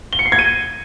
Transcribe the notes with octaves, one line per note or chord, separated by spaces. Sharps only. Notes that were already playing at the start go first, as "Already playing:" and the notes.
G7
C#7
C7
G#6
D#7